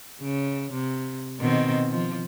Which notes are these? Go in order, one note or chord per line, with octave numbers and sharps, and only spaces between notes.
C#3
C3
B2 D#3 C4
F3